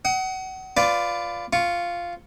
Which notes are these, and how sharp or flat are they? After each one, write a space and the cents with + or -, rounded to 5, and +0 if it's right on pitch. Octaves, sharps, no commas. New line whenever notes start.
F#5 +25 D#6 +35
F4 +0 B4 +25 D5 +0
F4 -5 C#6 +0